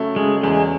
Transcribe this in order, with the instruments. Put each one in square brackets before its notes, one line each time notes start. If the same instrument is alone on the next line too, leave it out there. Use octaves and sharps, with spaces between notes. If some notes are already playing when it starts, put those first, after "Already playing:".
Already playing: [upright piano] C#3 F#3 A3
[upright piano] C#3 [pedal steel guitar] G#3
[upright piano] E2 [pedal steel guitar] G#3